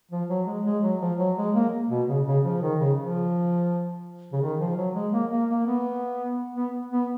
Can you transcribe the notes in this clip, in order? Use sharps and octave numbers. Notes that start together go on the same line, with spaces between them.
F3
F#3
G#3
G#3
F#3
F3
F#3
G#3
A#3
B2
C#3
C#3
F3
D#3
C#3
F3
C#3
D#3
F3
F#3
G#3
A#3
A#3
A#3
B3
B3
B3